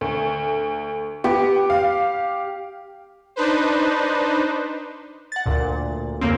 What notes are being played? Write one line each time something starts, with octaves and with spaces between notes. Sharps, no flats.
D2
B3 G4
F5
D4 D#4 B4 C5
F#5 A6
D2 A#2
F2 C#3 A#3 C4